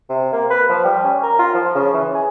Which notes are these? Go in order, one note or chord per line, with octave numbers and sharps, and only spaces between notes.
C3
A#3
B4
F3
G3
C#4
A#4
F4
F3
C#3
E3
G#4